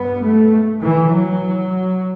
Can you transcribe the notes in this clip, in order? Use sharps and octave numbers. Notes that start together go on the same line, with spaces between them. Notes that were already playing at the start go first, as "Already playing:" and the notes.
Already playing: G2 B3
A3
E3
F#3